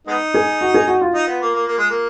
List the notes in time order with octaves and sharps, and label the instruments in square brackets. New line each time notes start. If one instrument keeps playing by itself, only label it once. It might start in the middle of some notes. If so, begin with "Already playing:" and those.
[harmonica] G#3 B3 D#4
[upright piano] G#4
F#4
G#4
F#4
F4
[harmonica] D#4
B3
A#3
A#3
A#3
G#3
A#3